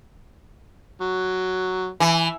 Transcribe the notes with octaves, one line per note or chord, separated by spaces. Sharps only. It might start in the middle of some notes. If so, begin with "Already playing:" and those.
F#3
E3